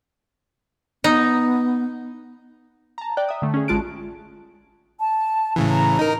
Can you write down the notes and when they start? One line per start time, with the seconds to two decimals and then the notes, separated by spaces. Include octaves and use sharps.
1.04 B3 D#4
2.98 A5 A#5
3.17 D5 G5 F#6
3.29 E5 D#6
3.42 D3 A3
3.54 C#4 G#4
3.68 A1 G#3 F4 A5 F#6 D7
5.00 A5
5.56 A2 C#3 E3
5.71 A#5
5.99 D#4 A#4